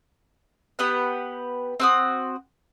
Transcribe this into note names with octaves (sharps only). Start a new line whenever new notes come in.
B3 G4 B4 F#5
C4 F#4 D#6